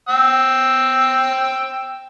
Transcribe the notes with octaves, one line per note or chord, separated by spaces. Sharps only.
G5 E6